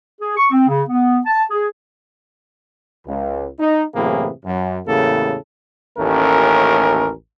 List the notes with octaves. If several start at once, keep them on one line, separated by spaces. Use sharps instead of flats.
G#4
C#6
C4
C#3
B3
A5
G#4
C#2
D#4
F#2 A2 C3 E3 A#3 G#4
F#2
E2 A2 C#3 A#3 G4 A4
A1 D#2 A3 C#4 A#4